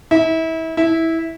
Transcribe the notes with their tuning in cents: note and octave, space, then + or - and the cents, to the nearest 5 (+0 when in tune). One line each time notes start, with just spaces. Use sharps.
E4 -30
E4 -15